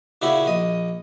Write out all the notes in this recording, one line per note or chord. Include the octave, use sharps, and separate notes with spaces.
A#2 C#3 E4 F#4 G4
A#1 D#5